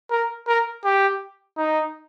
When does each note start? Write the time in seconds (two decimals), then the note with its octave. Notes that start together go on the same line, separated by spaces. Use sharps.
0.10 A#4
0.47 A#4
0.84 G4
1.57 D#4